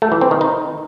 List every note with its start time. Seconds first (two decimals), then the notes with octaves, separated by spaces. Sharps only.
0.02 A3
0.12 E3
0.21 C4
0.31 D#3
0.41 D#4